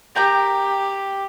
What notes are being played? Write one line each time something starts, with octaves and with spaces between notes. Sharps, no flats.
G4 A#4 G5 A#5